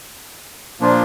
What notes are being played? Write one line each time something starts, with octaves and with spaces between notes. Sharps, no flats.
A#2 F3 A#3 D4 F4